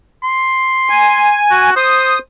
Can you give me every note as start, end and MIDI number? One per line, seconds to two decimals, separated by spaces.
0.23 1.37 84
0.90 1.70 80
1.51 1.75 66
1.76 2.17 72
1.76 2.19 87